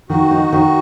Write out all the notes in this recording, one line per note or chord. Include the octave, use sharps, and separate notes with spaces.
D#3 F#4
D#4
D#3